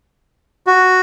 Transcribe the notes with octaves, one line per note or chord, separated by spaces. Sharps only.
F#4